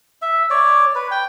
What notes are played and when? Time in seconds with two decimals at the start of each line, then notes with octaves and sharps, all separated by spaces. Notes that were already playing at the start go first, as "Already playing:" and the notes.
0.22 E5
0.50 C#5 D5
0.95 B4
1.11 G5